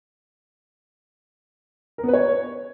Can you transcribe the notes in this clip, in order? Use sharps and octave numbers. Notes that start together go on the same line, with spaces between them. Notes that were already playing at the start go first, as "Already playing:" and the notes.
A#4
B3
B4
C#5